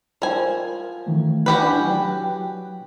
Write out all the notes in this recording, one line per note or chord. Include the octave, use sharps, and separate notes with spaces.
F3 A#4 G#5
D#3 E3 A3
F#4 G4 B4
D4 E4 G#5
F#3 G5